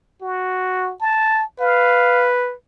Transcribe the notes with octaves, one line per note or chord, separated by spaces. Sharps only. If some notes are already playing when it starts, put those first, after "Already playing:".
F#4
A5
B4 F5